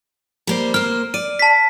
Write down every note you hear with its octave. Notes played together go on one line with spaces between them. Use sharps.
G3 A#3 C5
A#3 C5 F6
D5 D#7
A5 B6